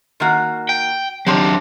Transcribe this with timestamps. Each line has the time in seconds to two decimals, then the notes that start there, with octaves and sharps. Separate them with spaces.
0.20 D#3 A#3 F#4
0.69 G5
1.26 D#3 F#3 C4 D4 G4